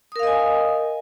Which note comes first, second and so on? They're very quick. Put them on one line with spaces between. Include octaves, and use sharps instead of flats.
D#6 A#4 F5 D#5 G#5